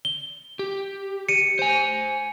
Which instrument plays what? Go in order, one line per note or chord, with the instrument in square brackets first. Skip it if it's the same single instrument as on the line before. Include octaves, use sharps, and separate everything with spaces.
[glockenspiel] G7
[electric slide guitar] G4
[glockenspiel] C#7 D#7
[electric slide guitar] C5 G#5 [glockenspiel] C#7